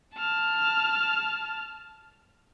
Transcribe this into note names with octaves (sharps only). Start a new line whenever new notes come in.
A5 F6